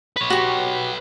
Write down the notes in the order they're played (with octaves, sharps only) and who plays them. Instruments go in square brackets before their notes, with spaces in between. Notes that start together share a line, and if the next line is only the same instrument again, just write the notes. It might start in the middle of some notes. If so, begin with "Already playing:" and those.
[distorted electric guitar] B4 C#5
[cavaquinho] F#4 G4